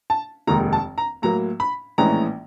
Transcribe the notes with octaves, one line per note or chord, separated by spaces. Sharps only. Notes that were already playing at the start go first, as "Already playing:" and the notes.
A5
F1 D#2 D#3 G#3 A#5
A5
A#5
A2 F#3 A#3 A#5
B5
A#1 A2 E3 G#3 C#4 A#5